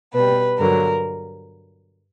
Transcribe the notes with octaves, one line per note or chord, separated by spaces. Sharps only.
B2 G3 B4
G2 D3 F#3 A#4